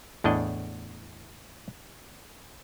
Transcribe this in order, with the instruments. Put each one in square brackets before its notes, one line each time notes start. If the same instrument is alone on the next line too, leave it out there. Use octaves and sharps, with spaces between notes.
[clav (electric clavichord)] E2 A2 D4 D#5